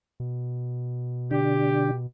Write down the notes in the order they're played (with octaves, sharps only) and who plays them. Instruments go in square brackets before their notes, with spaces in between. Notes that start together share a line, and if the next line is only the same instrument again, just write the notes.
[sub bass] B2
[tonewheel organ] D3 D4 [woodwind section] G4